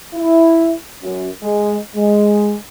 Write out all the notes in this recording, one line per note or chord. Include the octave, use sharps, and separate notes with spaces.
E4
F#2
G#3
G#3